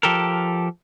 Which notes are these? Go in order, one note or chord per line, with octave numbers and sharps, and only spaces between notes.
F3 G4 A4 A#4